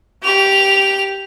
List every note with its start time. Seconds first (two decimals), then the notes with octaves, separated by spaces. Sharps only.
0.23 G4 F7